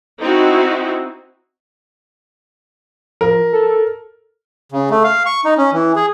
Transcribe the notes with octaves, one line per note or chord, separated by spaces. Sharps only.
C4 D#4 E4 F#4
F3 A#4
A4
C#3
A3
F5
C#6
D#4
C#4
E3
G#4